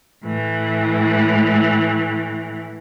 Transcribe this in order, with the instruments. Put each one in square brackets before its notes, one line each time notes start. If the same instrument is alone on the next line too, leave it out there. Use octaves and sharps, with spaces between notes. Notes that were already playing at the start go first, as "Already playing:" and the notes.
[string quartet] A2 E3